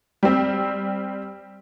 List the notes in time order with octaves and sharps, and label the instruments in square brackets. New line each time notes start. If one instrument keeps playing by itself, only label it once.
[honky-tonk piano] G3 C4